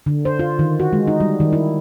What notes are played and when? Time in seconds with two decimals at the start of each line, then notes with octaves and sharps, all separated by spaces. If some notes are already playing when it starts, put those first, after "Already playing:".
0.06 D3
0.25 C5
0.39 F4
0.59 D#3
0.80 F#4
0.93 G#3
1.08 D#4
1.20 G3
1.40 D#3
1.53 E4